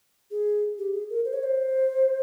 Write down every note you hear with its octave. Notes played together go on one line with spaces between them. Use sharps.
G#4
G4
G#4
A#4
C5
C#5
C5